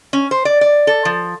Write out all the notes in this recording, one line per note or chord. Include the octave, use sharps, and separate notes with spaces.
C#4
C5
D5
D5
A4
F3